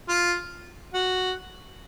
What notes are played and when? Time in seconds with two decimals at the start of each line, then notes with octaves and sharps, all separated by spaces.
0.09 F4
0.94 F#4